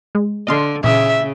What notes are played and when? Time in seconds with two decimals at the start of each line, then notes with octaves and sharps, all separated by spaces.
0.15 G#3
0.47 D3 D#5 F5 C6
0.84 A#2 C#3 E3 E5 D#6